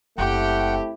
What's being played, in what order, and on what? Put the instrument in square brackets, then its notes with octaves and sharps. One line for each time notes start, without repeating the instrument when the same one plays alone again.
[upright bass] F#1 [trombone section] A3 C4 E4 [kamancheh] G4 [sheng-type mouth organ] F#5 G5